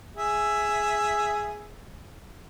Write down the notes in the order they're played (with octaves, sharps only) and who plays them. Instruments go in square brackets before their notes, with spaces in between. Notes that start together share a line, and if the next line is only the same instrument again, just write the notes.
[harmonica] G#4 E5